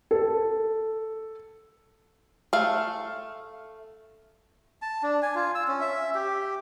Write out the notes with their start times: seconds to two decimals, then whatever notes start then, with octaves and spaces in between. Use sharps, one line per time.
0.11 A4
2.53 A3 F5
4.82 A5
5.03 D4
5.22 G#5
5.35 F4
5.55 E6
5.68 C#4
5.81 E5
6.15 G4